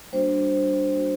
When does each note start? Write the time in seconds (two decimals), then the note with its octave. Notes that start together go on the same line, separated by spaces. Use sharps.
0.12 G3 A#3 D4 F#4 C5
0.92 G3 A#3 D4 F#4